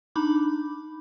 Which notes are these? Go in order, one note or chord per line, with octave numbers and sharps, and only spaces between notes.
D4 D#4 B5 D6